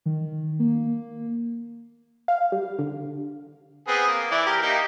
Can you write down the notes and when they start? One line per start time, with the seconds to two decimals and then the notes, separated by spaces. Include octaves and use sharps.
0.06 D#3
0.59 A#3
2.28 F5
2.52 G3
2.79 D3
3.88 B3 C4 G#4
4.07 A#3
4.31 E3 E4 D5
4.46 G4 A#4
4.62 A#3 D#4 G4